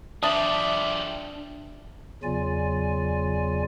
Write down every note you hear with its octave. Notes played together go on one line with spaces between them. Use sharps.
F3 G3 D4 D5 E5 A5 D#6
E2 C#3 F#3 F4 D5 G#5